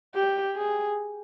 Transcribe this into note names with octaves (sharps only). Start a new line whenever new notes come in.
G4
G#4